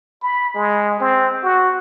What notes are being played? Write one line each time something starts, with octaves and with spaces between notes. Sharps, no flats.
B5
G#3
C4
F#4